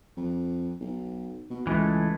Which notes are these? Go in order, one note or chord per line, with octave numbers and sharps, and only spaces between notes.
F2
B1
B2
C#2 E3 G#3 A3